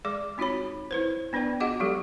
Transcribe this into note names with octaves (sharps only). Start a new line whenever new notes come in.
G#3 G#4 D5 D6
C4 D#4 F4 F#4 C#5 B5
E4 B4 C5
B3 D4 B4 D5 G5
F4 F#4 G#4 D#5 F#5 D6
F#3 G#3 G4 A4